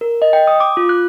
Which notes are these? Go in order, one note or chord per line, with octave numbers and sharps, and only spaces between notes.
A#4
D#5
G5
D#6
D6
F4
F#6